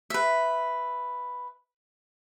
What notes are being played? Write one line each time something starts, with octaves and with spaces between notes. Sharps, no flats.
B4 E5